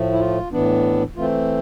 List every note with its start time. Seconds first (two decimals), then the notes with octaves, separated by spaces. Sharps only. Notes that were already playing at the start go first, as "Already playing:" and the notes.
Already playing: A2 F3 A3
0.12 E4
0.20 F4
0.52 A2 E3 B3 D4
1.16 E3 A3 C4 F4